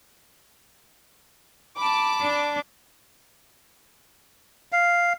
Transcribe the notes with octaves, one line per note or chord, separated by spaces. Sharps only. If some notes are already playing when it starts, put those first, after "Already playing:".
A5 B5 D6
D4
F5